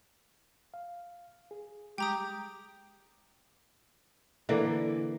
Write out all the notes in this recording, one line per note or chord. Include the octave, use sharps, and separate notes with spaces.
F5
G#4
G3 G#3 G4 G5 A#5 D#6
D3 E3 A#3